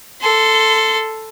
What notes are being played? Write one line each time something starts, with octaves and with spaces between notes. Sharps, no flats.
A4 C6